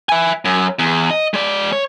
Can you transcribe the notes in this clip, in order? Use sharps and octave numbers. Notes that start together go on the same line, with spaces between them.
E5 G#5
F#2
E2
D#5
G#3 D5
C#5